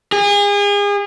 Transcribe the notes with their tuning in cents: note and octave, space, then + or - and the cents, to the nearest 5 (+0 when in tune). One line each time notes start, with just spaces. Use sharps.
G#4 -35